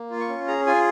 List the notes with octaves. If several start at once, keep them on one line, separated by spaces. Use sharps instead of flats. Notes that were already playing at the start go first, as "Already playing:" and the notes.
Already playing: A#3
F4
C#6
C#4
G#4 A#5
F4 G#5